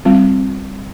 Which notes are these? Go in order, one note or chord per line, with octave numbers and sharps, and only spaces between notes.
G3 C4 F4